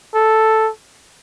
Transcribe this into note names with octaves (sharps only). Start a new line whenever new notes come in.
A4